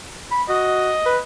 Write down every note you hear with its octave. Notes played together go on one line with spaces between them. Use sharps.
B5
F#4 D#5
B4